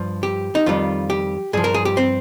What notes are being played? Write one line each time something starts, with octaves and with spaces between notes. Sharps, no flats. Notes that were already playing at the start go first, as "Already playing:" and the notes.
Already playing: G2 F3
G4
D#4
F2 D#3 G3 F4
G4
G2 F3 G#4
A#4
G#4
G4
C4